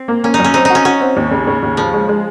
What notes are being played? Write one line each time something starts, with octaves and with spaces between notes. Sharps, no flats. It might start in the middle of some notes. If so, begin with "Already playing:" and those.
Already playing: C4
A#3
A#3 C#4
D#4
F#2
C#4
C4 D#4
D#4 F#4
C#4
C#4 F#4
C4
D#2
C#3
C#3
D#2
C#3 F3
G#3
G#3